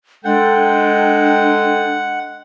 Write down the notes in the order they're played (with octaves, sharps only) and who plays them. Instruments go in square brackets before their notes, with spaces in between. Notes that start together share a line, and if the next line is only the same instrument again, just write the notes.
[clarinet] G#3 [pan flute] D4 [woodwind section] A4 G5 [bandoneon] F#5